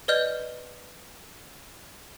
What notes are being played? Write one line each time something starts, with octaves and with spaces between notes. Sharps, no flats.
B4 D5 D#5 F6 G6